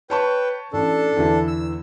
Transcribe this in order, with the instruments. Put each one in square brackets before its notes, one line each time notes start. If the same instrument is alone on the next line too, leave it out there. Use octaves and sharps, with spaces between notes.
[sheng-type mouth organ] B4 G5 [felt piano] C#5 A5 C#6
[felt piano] A1 [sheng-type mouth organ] D4 A4
[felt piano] E2 D3 E3
[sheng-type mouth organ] E6